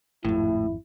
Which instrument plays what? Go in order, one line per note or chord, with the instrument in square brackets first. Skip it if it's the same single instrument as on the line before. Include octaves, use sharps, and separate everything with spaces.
[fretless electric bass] G#1 F2 [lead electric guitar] A2 [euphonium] E4